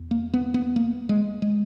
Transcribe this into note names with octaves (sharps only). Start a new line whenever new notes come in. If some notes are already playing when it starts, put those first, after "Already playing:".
Already playing: E2
A#3
B3
B3
A#3
G#3
G#3